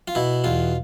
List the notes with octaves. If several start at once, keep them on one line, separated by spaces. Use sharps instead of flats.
F4
B2 E4
E2 F4